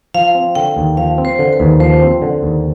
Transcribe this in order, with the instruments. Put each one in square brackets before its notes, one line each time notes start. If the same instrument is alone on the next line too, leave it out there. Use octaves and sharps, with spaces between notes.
[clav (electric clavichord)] F3 [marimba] F5
[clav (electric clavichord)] C4
[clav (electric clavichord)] D3 [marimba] G5
[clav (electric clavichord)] D#2
[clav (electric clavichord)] F3 [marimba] F5
[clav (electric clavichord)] C4
[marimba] C5
[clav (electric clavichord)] D3
[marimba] B4
[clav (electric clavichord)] D#2
[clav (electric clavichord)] F3 [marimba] C5
[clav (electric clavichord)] C4
D3
D#2